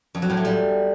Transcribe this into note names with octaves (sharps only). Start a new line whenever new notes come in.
F2
F#3
A2
A3
G3